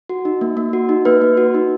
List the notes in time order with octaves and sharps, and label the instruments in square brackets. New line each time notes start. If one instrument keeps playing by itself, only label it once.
[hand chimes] F#4
D#4
A#3
A#3
F#4
D#4
A#3 B4
A#3
F#4
D#4